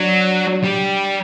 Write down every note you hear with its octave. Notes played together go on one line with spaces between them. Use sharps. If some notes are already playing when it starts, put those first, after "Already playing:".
Already playing: F#3 D4
G3